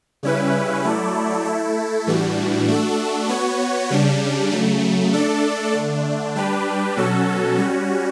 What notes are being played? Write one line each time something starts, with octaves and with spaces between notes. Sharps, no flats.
C#3 G3 C#4 E4 B4
F#3 A3 E4 A4 D5
A3 E4 A4
A2 E3 G3 D4 F#4
A3 D4 F#4 A4
B3 F#4 C#5
C#3 G3 D4
C#3 F#3 A3
A3 D4 A4 D5
D3 A3 D4
G3 D4 G4 B4
B2 F#3 C#4 F#4 A4
G3 C#4 F#4